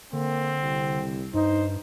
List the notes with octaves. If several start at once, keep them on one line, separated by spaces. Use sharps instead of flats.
D3 A#3 C4
C2
G2 D#4 C5